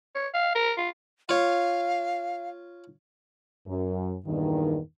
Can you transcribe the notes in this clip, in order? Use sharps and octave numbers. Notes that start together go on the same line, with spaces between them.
C#5
F5
A#4
F4
F4 C#5 F5
F#2
E2 G2 A#2 D#3